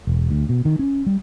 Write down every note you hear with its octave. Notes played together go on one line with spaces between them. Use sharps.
E1
D2
B2
D#3
C#4
G3